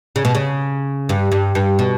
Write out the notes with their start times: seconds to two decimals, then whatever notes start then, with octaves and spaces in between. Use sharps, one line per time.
0.16 C#3
0.25 B2
0.35 C#3
1.09 G2
1.32 G2
1.55 G2
1.79 B2